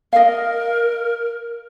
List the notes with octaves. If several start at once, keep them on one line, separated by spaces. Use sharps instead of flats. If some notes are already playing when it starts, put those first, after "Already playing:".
A#4 D#5 F5